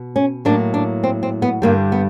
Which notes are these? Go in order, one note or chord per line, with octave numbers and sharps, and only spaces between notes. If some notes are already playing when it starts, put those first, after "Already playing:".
Already playing: B2
C#4
A2 F#3 A#3 D4
D4
C4
C4
B3
G2 D3 G3 A#3
B3